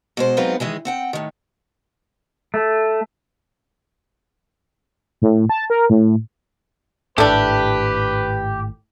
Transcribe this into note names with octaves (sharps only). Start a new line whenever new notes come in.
B2 G#3 C5
F#3 G#3 B3 C4 D#4 F4
D#3 E3 G#3 G#4
C4 F#5 G5
A2 D#3
A3
A2
A5
A#4
A2
G#1 A2 A3 D4 G4 B4